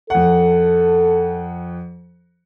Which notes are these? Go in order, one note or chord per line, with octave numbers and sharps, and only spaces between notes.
F2 A4 F#5